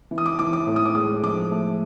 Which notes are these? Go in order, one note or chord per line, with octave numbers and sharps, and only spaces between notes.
E3
D#6
D6
E3 D6
D6
A2
D#6
D6
G#3 D#6
F3 D6
A3